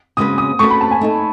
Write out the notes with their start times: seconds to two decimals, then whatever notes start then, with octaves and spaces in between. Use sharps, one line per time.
0.17 C#3 G#3 C#4 F#4 B4 D#6
0.38 D#6
0.59 A3 C#4 F#4 B4 C#6
0.70 B5
0.81 A5
0.91 G#5
1.01 A3 D#4 A4